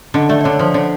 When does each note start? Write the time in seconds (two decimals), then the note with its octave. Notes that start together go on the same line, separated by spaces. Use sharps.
0.14 D3 D#5
0.29 A3 D5
0.41 D5
0.44 D3 C#5
0.59 F3 C5
0.74 D3 C#5